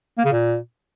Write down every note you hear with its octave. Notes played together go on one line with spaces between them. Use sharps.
A#3
C#3
A#2